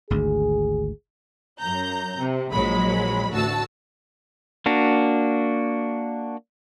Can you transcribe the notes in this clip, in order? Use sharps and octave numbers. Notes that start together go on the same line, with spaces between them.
G#1 D2 G#4
F#2 A#5 G6
C3
A#1 F#3 G#3 B5
A1 D2 F#4 A5 E6
A#3 D4 F#4